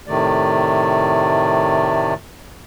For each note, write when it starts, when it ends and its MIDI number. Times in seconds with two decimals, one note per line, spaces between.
0.07 2.14 45
0.07 2.14 48
0.07 2.14 51
0.07 2.14 57
0.07 2.14 74